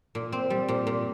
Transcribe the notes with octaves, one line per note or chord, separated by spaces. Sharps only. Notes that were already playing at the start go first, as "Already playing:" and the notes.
A#2
C4
G3
A#2
A#2